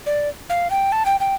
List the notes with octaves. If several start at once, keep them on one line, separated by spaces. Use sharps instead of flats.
D5
F5
G5
A5
G5
G5